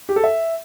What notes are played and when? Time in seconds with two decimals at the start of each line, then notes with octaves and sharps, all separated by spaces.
0.09 G4
0.16 A4
0.24 E5